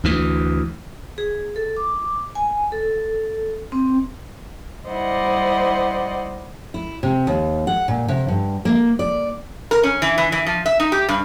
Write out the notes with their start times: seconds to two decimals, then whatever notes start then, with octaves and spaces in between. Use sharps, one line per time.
0.04 D2 E3
1.18 G#4
1.56 A4
1.77 D6
2.35 G#5
2.72 A4
3.72 C4
4.86 G3 E4 C5 D5 D#5 F#5
6.74 E4
7.03 C3
7.27 D#2
7.67 F#5
7.88 A#2
8.08 C3
8.28 G2
8.65 A#3
8.99 D5
9.71 A#4
9.83 C#4
10.02 E3
10.18 E3
10.32 E3
10.46 F3
10.66 E5
10.80 D#4
10.92 G4
11.08 G2